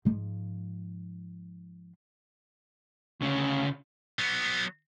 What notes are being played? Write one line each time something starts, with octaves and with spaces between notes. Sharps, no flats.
G#2 F3
D2 C#3
F#3 B3